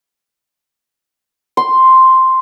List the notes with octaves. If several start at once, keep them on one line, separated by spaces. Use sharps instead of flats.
C6